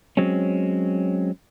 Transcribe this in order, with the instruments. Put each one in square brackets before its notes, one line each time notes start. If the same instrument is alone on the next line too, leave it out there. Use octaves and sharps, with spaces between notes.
[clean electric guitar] F#3 G#3 C4 C#4